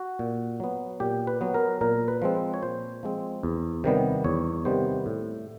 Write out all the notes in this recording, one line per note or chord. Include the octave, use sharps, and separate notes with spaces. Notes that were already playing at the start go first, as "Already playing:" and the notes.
Already playing: F#4
A#2
F#3 B3
A#2 G4
B4
F#3 B3
A#4
A#2 A#4
B4
F3 G#3 C4
C#5
A#2 C5
F3 G#3 C4
E2
C3 D#3 G3 B3
E2 C#5
C3 D#3 G3 B3 C5
A2